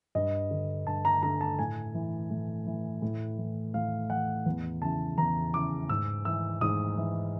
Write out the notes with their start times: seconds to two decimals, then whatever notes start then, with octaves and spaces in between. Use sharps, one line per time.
0.15 G2 D#5
0.51 D3
0.87 G2 A5
1.05 A#5
1.23 D3 A#5
1.41 A5
1.59 A2 G#5
1.94 E3
2.30 A2
2.67 E3
3.02 A2
3.38 E3
3.74 A2 F5
4.10 E3 F#5
4.46 E2
4.81 C#3 E3 A5
5.18 E2 A#5
5.54 C#3 E3 D6
5.89 G#2 E6
6.25 E3 E6
6.61 G#2 D#6
6.97 E3